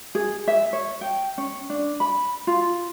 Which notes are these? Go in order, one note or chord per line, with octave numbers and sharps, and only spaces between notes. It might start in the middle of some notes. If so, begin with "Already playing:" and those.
G#4
E5
C#5
G5
C#4
D4
B5
F4